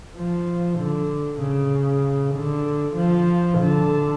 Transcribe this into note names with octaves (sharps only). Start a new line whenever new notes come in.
F3
D3
C#3
D3
F3
D3